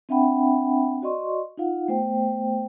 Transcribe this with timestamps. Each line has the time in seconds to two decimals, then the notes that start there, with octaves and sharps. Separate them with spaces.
0.09 C4 D4 E5 F#5 G5 B5
1.02 F#4 D5 D#5 C6 C#6
1.57 D#4 F4 F5 F#5
1.88 A3 B3 C5 G5